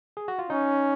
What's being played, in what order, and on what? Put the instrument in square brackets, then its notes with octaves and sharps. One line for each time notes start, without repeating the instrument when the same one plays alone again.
[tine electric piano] G#4
F#4
F4
[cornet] C#4 [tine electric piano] D#4